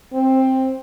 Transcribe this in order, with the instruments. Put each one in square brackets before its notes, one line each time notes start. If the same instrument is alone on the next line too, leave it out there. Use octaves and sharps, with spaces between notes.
[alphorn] C4